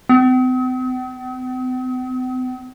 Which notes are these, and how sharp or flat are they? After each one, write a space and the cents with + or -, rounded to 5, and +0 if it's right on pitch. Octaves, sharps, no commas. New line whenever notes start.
C4 -45